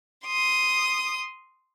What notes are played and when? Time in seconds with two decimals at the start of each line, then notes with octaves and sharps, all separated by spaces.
0.25 C6 D#6